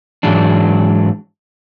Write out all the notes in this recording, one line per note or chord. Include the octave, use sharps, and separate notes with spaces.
G#2 E3 F#3 G#3 D4